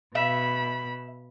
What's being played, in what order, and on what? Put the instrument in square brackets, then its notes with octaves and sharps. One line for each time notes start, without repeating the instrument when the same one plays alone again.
[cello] B2 [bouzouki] E5 [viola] B5